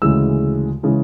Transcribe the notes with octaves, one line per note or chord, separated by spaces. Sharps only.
D2 C#3 E3 G#3 E6
C#3 E3 G#3